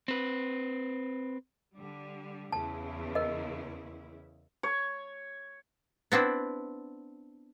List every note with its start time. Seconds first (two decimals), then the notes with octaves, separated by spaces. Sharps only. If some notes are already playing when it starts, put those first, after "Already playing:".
0.08 C4 B4
1.75 D3 G3
2.52 E2 C#3 E4 A5
3.15 A#4 D#5
4.63 C#5
6.12 B3 C4 D4 E4